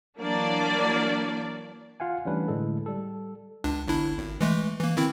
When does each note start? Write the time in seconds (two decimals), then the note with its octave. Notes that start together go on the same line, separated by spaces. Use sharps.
0.18 E3 F#3 A#3 D4 D5
2.00 F4 F5 F#5 G#5
2.25 E3 G3 A3 C#4 D4 B4
2.48 A2 D3 G#3 A4
2.86 G3 A4
3.64 C#2 D4
3.88 G1 D4 E4
4.18 G#1
4.41 E3 G#3 A3
4.80 E3 A#3
4.97 D#3 C4 E4